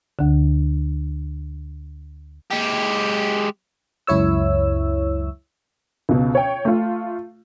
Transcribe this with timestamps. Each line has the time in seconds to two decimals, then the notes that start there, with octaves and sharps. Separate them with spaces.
0.19 D2 D3
2.51 G#3 G4
4.07 C#2 F#2 E4 C#5 E6
6.09 C#2 B2
6.35 C#5 G5
6.65 A3 F4